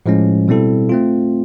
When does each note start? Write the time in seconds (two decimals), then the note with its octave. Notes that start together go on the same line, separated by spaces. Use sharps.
0.06 A2 F3 G#3 C#4
0.48 B2 G3 C4 E4 A4
0.89 A3 C4 F4